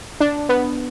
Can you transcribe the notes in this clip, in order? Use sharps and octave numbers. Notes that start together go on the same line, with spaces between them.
D4
B3